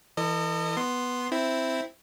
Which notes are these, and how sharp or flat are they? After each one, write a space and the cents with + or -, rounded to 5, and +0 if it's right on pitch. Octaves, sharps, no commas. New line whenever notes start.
E3 +0 A4 +35 D#5 -30
B3 +0 C6 +0
C4 +0 E4 +0